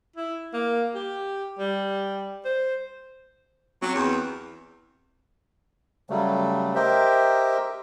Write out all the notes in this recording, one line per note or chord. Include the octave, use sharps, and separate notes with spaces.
E4
A#3
G4
G3
C5
F#3 C4
E2
C#3 F#3 G3 A3
G4 A#4 C5 D#5 E5 G5